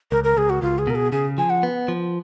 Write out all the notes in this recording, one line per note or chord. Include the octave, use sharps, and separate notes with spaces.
C#2 A#4
A#4
C#2 G#4
F#4
C#2 F4
G#4
B2 A#4
G#4
C#3 G#4
F3 G#5
F#5
B3
F3